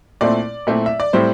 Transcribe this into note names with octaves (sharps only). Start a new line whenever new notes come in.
A#2 A3 C4 E4 D5
A#2 A3 C4 E4
E5
D5
A2 G3 C4 E4 C5